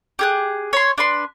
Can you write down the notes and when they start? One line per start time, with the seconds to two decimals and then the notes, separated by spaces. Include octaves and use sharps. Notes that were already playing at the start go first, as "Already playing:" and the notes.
0.19 G4 G#4 F#6
0.73 C#5 C6
0.98 D4 B4 C6